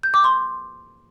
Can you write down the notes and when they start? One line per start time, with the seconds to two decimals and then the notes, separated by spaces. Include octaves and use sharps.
0.03 G6
0.14 D6
0.24 C6